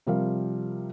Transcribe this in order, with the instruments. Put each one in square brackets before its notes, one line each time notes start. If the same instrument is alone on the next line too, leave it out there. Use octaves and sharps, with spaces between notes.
[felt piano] C3 F3 G3 A#4 F5